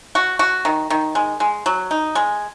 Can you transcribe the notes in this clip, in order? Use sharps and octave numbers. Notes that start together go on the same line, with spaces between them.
F#4
F#4
D#3
D#3
G#3
G#3
F#3
D#4
G#3